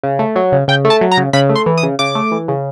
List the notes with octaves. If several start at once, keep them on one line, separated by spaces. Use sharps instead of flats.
C#3
A3
F#3
C#3
C#3 G5
A3
A5
F#3
A#5
C#3
C#3 B5
A3
C6
E3
D#6
C#3
C#3 D6
A3
E3
C#3